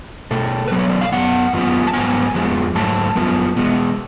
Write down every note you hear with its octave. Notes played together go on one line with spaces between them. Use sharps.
B2 A3 A4
B2 F#3 B3 B4
C#5
D5
F5
F#2 F3 B3 F#5
F#2 F3 B3
A5
G#2 F#3 B3 G#5
F2 F3 G#3 B3
G#2 F#3 A3 A5
F#2 F3 B3
B2 G#3 B3